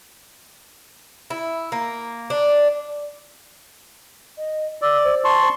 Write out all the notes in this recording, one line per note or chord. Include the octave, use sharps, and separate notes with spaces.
E4
A#3
D4
D#5
D5 E6
C5
A5 C6 C#6